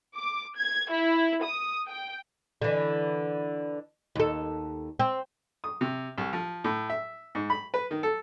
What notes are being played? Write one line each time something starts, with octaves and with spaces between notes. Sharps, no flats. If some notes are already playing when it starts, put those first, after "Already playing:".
D6
G#6
E4
D#6
G5
D3 E3
D#2 A4
C4
D#6
C3
C2
F3
A2
E5
G#2
B5
B4
D#3
A4